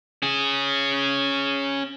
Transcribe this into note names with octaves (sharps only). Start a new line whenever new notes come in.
C#4 G#4